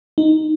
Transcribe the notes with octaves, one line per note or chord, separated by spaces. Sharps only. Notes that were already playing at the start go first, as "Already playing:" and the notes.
D#4